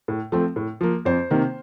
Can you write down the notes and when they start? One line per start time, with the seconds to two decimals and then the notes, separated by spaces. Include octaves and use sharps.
0.08 A2
0.32 F3 A3 C4
0.56 A2
0.81 F3 A#3
1.05 F2 C5
1.31 C3 D#3 A#3